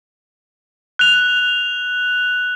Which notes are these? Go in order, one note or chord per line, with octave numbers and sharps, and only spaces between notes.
F#6 F7